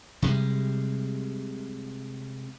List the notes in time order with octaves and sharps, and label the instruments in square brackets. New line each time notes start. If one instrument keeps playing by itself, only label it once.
[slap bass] C3 G3 G#3